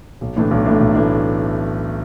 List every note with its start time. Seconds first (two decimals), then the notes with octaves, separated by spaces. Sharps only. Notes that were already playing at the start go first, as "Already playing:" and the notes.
0.21 B1
0.36 A2 E3 A3 D4
0.51 B1
0.65 A2 E3 A3 D4
0.80 B1
0.95 A2 E3 A3 D4